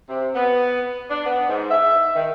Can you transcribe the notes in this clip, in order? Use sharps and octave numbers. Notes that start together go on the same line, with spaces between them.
C3
B3
D4
B3
G#2
E5
D#3